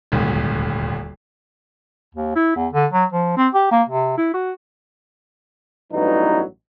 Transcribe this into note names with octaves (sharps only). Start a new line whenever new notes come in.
D#1 G#1 D2
D#2
E4
E2
D3
F#3
F3
C4
G4
A#3
C3
E4
F#4
A1 G2 E3 F#3 B3 D#4